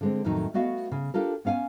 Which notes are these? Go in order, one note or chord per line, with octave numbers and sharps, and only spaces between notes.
D3 G#3 C4
F2 A2 D#3 F#3 D#4
A3 B3 F#4 D#5 F5
C#3
D4 F4 G4 A4 A#4
B3 C#4 F5 F#5 G#5